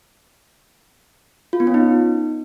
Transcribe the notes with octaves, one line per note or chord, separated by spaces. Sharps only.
F4
B3
C#4
D#4